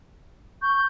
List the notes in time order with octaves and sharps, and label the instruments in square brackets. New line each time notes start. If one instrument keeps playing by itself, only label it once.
[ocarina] C#6 [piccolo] G6